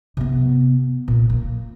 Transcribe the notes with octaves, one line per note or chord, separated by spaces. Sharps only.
C3 B3
A#2
A#3